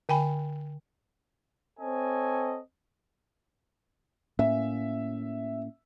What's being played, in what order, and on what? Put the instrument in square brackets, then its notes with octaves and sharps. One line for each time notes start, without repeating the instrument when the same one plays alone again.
[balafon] D3 G5 G#5 B5
[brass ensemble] C4 A4 C#5 D#5 G#5
[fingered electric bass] A2 A#3 C#4 [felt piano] E5